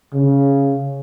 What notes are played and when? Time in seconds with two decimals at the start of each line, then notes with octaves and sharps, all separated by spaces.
0.13 C#3